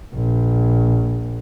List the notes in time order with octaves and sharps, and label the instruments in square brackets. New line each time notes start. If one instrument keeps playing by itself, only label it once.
[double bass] A#1